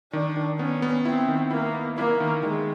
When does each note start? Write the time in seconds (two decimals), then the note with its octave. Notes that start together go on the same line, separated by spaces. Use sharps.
0.13 D#3 D4
0.37 D#3
0.59 B3 C#4
0.82 B3
1.05 C4 E4
1.28 D#3
1.51 A#3 E4
1.75 B3
1.97 A#3 E4
2.20 D#3
2.43 D#3 G#3